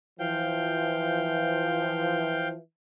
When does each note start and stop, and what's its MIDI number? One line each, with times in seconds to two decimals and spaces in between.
0.20 2.57 52
0.20 2.57 53
0.20 2.48 77
0.20 2.48 79
0.20 2.48 91